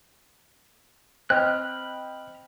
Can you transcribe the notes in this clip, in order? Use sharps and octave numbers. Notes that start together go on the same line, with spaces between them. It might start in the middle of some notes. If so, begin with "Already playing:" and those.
C4 D#5 G5 B5 F6 F#6